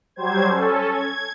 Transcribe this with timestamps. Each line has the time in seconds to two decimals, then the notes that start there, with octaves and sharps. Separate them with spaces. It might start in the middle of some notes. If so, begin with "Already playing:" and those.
0.16 F#3 G3 C5 G#6
0.46 C#4 A4
0.89 G#6